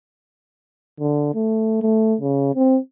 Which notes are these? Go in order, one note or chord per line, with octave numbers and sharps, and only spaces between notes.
D3
A3
A3
C#3
C4